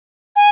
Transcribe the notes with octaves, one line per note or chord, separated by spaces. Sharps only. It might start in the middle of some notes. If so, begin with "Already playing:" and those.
G#5